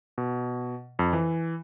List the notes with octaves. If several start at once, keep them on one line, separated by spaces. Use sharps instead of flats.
B2
F2
E3